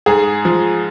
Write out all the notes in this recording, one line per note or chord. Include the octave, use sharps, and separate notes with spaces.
G#2 G#4
F3